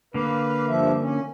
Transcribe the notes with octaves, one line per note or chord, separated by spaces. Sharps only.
D3 A#3 B4 F5
G2 F3 E5
C#4